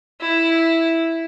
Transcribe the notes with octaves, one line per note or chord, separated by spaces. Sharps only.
E4